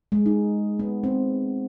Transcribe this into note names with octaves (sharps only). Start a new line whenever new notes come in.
G#3
D#4
B3
C4